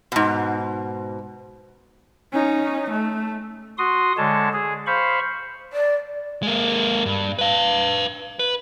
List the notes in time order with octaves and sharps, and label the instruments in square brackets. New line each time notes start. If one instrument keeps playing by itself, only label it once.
[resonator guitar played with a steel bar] G#2 B2
[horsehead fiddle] C#4 D#4
A3
[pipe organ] F#4 C6 D#6
D3 G#3 C#5 A5
G#4
C5 F5 B5 C#6
[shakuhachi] D5
[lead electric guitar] G#3 A#3
G2
B4 F5
B4